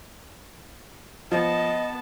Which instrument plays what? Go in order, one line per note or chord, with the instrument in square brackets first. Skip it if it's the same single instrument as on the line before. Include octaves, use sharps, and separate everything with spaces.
[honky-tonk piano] F3 [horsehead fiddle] B3 A5 [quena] D#5